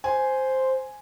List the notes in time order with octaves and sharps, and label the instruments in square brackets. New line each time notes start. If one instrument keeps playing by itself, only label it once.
[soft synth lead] C5 [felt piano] G#5